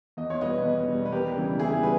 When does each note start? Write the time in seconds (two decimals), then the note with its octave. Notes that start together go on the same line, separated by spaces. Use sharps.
0.17 E2 D#5
0.30 C#5
0.41 B2 G3 B4 D#5
0.65 E2
0.88 B2 G3
1.06 B4
1.12 E2 G4 A#4
1.36 C#3 E3 G3
1.60 E2 E4 G#4
1.83 G3 B4